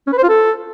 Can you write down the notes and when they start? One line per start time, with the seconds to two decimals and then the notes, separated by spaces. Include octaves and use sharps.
0.07 C#4
0.13 B4
0.18 C5
0.23 F4
0.29 A4